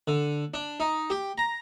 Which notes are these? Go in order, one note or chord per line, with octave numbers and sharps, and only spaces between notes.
D3
D4
D#4
G4
A#5